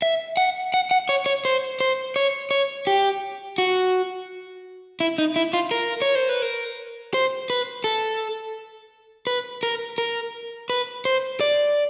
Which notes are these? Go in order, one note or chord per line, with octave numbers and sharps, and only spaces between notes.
E5
F#5
F#5
F#5
C#5
C#5
C5
C5
C#5
C#5
G4
F#4
E4
D#4
E4
F4
A#4
C#5
C5
B4
A#4
C5
B4
A4
B4
A#4
A#4
B4
C5
D5